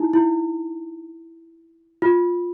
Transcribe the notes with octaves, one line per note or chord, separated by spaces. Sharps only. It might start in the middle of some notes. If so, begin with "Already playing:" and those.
Already playing: D#4 E4
E4
F4